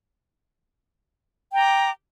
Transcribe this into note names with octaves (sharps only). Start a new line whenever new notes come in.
G5 A#5 D6